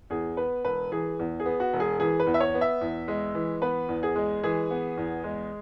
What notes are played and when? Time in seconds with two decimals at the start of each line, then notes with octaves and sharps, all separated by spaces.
0.10 E2 G#4
0.37 B3 B4
0.65 E1 B4
0.92 E3 G#4
1.19 E2
1.40 G#4
1.46 B3
1.60 F#4
1.73 E1
1.80 G#4
2.00 E3 G#4
2.20 B4
2.27 E2
2.34 E5
2.40 C#5
2.54 B3
2.61 E5
2.81 E2
3.08 G#3
3.35 E3
3.62 B3 B4
3.89 E2
4.03 G#4
4.16 G#3
4.43 E3 G#4
4.71 B3
4.97 E2
5.24 G#3